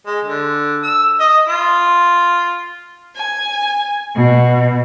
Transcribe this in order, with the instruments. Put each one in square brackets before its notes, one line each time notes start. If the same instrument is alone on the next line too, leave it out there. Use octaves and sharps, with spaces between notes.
[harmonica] G#3
D3
E6
D#5
F4
[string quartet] G#5
B2